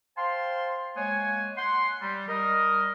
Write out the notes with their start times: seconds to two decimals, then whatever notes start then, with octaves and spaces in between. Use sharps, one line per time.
0.17 C5 F5 G5 A5 C6
0.97 G#3 A#3 C#5 F#5 G#5
1.57 F#5 C6
2.02 G3
2.28 G3 A#4 D#5